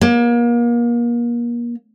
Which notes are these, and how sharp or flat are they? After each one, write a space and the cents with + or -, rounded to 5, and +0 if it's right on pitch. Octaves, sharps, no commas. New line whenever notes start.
A#3 +35